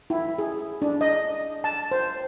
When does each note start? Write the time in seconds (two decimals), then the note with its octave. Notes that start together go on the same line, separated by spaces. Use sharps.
0.10 E4
0.39 G#4
0.82 D4
1.01 D#5
1.64 A5
1.91 C5